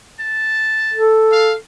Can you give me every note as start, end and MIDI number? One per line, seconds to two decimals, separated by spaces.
0.20 1.11 81
0.93 1.54 69
1.32 1.54 77